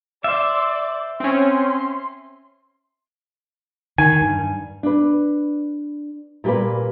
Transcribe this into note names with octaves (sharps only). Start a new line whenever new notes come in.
C5 D5 E5
C4 C#4 C6
D#3 G#5
G2
D4 B4
A#2 G3 A#3 F#4 G#4 B4